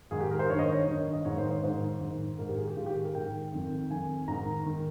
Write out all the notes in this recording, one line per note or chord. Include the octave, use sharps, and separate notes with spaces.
G#2 D#3 G#4
G4
A#4
C5
G2 D#3 C#5
D#5
C#5
D#5
G2 D#3
D#5
G#2 D#3 C#5
C5
C5
G#2 D#3 C5
G#2 D#3
G#2 D#3 A#4
G4
G#4
G4
G#2 D#3 F4
G4
G#4
A#4
G#2 D#3 G5
F2 D#3
F2 D#3 G#5
G#2 D#3 A#5
D#3